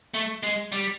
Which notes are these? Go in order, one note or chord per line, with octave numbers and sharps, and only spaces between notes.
A3
G#3
G3